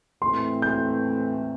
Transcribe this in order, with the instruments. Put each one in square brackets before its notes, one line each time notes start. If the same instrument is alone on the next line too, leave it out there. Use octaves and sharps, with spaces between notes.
[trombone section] A2 E3 A3 C4 [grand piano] C6
[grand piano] G6